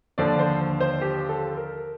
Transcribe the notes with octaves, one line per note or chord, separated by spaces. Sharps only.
D#2 D3 F3 D5
C5
C5
G4
A4
A#4